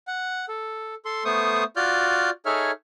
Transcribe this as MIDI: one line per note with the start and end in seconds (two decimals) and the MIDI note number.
0.07 0.45 78
0.49 0.95 69
1.05 1.24 69
1.05 1.24 84
1.25 1.64 57
1.25 1.64 59
1.25 1.64 72
1.25 1.64 85
1.25 1.64 87
1.76 2.30 65
1.76 2.30 66
1.76 2.30 74
1.76 2.30 89
1.76 2.30 91
2.46 2.71 63
2.46 2.71 68
2.46 2.71 69
2.46 2.71 73
2.46 2.71 76
2.46 2.71 89